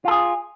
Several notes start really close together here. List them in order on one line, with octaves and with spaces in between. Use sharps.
F4 A4 G#4